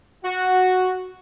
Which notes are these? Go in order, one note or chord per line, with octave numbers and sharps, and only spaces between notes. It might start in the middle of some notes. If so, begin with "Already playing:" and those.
F#4